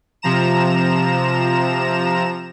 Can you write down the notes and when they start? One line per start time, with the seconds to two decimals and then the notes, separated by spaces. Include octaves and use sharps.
0.22 C3 F3 A#5 E7